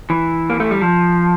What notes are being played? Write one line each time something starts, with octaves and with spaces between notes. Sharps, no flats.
E3
A#3
A3
G3
F3